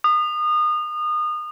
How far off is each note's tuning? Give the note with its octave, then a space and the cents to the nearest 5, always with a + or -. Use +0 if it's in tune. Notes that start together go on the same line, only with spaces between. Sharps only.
D#6 -30